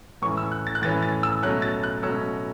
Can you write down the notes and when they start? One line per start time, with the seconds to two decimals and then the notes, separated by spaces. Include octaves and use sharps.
0.22 A2 E3 C#4 C#6
0.37 E6
0.52 F#6
0.67 A6
0.75 F#6
0.82 A2 E3 C#4 A6
1.03 A6
1.23 E6
1.42 B2 F#3 A3 C#4 F#6
1.62 A6
1.83 F#6
2.02 B2 F#3 A3 C#4 E6